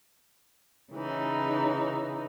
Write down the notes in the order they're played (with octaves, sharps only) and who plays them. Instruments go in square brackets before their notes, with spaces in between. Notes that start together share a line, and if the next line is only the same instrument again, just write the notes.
[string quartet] C#3 E3 D#4